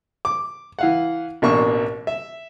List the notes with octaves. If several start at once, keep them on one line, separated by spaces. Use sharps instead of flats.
D6
E3 F5 F#5
A1 B2 A#3 D4 E5 C#6
E5